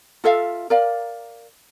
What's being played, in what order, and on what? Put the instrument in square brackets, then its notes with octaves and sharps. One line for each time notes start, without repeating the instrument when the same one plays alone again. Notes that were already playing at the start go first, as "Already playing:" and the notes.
[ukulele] F4 A4 E5 F5
A#4 D5 F5